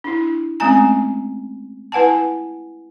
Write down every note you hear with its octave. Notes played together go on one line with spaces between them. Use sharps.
D4 E4
G#3 A3 C4 C#4 G#5 A#5
E4 B4 F#5 G#5 A5